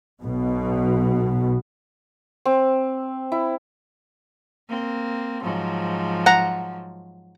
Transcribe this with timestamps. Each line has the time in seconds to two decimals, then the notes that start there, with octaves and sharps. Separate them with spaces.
0.23 B1 B2
2.45 C4
3.32 E4
4.69 A#3 C4
5.43 G#2 F3 F#3
6.26 F#5 A#5